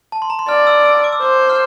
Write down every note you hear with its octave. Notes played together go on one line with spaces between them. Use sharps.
A5
C6
A#5
C6
D5 F6
E6
E6
D6
E6
C5 D6
F6